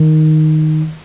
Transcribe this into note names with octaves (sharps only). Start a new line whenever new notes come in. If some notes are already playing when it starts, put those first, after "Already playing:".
Already playing: D#3